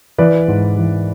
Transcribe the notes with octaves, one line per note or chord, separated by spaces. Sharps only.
E3 B4 D5
G#2
E3